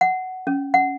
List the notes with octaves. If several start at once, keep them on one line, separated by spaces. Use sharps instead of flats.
F#5
C#4
F#5